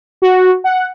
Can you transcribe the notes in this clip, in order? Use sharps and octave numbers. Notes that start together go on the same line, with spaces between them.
F#4
F#5